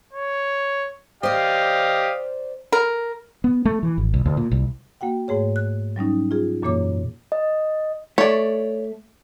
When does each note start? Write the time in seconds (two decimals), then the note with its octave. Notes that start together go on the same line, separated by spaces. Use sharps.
0.13 C#5
1.23 G4 C5 D5 D#5 F5
2.72 A#4
3.44 B3
3.65 A3
3.83 E3
3.98 G#1
4.14 C2
4.25 D2
4.37 A#2
4.52 C2
5.01 A#3 F#4 F#5 G5
5.28 G#2 A3 G#4 C#5
5.56 F#6
5.96 F#3 G3 C#4 D#4
6.31 F4 G#4
6.62 F#2 A#2 E3 A#3 C#5 D6
7.32 D#5
8.18 A3 C#5 D5